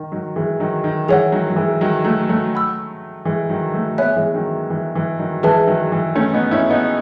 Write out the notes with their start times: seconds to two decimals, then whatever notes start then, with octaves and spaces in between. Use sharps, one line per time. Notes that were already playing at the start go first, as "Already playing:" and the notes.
Already playing: D#3
0.12 D#3 F#3
0.36 E3 G#3
0.60 D#3 F#3
0.84 D#3
1.09 E3 G#4 C#5 F#5
1.32 D#3 F#3
1.50 F#3
1.56 E3 G#3
1.81 D#3 F#3
2.04 F#3 A3
2.29 F#3 A3
2.53 F#5 B5 E6
3.25 E3 G#3
3.49 D#3 F#3
3.74 F#3 A3
3.98 G#3 B3 C#5 E5 G#5 B5 F#6
4.16 E3 G#3
4.34 D#3 F#3
4.70 E3
4.95 E3
5.19 D#3 F#3
5.43 E3 G#3 G#4 B4 E5 A5
5.67 D#3 F#3
5.92 E3
6.16 A3 C#4
6.33 B3 D#4
6.51 C#4 E4
6.70 B3 D#4